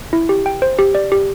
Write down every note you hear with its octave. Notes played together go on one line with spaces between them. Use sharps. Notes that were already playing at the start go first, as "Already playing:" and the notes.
E4
G4
G5
C5
G4
D5
G4